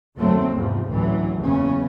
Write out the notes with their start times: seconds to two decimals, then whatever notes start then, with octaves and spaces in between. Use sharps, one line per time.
0.18 F#1 D#2 F#3 A3 C4
0.54 E2 G#2 C3 F3
0.89 A1 D2 E3 F#3
1.39 F#1 E2 C#3 B3 C#4